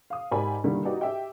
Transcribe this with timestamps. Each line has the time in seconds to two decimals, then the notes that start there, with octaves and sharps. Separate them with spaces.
0.10 F5 D#6
0.31 G#2 G4 A#4 D5 G#5 B5
0.64 D3 D#3 G3 A#3 E4
0.85 D#4 F#4 G4 B4 D5 D#5
1.01 G4 E5 G5